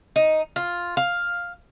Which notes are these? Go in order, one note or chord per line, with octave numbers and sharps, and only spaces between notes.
D#4
F4
F5